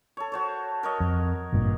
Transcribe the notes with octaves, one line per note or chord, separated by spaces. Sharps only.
A4 C#5
F#4 C5 C#5
A#4 C#5 D#5
F2
G#1 G2 A#2